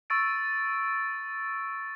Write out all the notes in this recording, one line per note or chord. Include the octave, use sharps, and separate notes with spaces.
C#6 E6 A6 D7